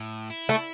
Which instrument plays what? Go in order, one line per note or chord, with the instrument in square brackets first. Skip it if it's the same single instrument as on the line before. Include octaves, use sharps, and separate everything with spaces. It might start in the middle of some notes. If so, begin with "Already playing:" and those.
Already playing: [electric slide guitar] A2
E4
[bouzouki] A3